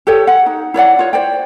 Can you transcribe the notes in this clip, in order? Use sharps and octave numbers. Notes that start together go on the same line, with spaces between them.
G4 A4 C#5 G5
F#5
D#4
E4 C#5 D5 F#5
F4 C#5
C5 D5 G5